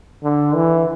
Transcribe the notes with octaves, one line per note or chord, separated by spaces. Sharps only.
D3
E3